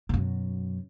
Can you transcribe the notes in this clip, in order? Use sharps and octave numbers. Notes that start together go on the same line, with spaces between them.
F#2 B2